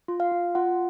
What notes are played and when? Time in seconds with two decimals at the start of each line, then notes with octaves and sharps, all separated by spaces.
0.08 F4
0.20 F5
0.32 F4
0.55 F4 F#5